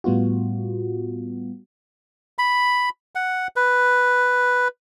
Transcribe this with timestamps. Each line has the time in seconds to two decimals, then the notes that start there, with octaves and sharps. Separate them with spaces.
0.04 A2 G3 B3 F4 F#4
2.39 B5
3.15 F#5
3.56 B4